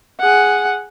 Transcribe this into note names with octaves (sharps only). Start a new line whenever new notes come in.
G#4 F#5